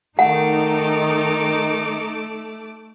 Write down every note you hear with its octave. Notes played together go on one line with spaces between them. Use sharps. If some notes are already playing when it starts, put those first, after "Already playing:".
D#3 A3 D#4 F#5 D6